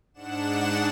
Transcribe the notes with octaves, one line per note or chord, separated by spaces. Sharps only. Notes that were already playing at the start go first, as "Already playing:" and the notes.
G#2 D4 F#5 E7